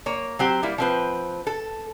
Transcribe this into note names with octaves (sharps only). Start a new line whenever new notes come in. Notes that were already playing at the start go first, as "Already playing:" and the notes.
A#3 C#5
F#3 C4 G4
G3 A#3 E4
F3 C4 B4
A4